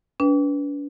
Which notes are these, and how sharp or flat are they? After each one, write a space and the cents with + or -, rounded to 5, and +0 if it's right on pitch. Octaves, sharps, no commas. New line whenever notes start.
D4 -40 B4 +0 G5 +15